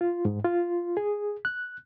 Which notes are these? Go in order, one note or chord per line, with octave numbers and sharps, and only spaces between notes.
F4
G#2
F4
G#4
F#6